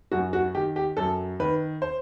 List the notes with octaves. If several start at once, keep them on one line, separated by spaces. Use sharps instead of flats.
F#2 F#4
F#4
D#3 G4
G4
F#2 A4
D#3 B4
C5